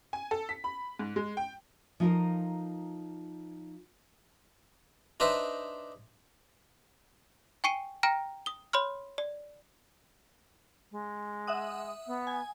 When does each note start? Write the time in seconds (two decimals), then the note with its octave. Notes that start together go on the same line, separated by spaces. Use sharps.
0.13 G#5
0.31 A4
0.49 B6
0.64 B5
0.99 G#2
1.16 G#3
1.37 G5
2.00 F3 D#4 F4 A4 A#4
5.20 D4 D#4 B4 C5 D#5 E5
7.64 G5 G#5 C#6 C7 C#7 D#7
8.03 G5 A#5 F6 A#6 D7
8.46 D#6 G7
8.73 C#5 B5 C6 F6
9.18 D5
10.91 G#3
11.47 E5 F#5 D#6
12.07 B3
12.27 G#5